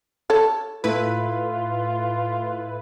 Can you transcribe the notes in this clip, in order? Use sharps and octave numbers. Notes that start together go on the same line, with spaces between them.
A4 C#5
A2 E4 F4 B4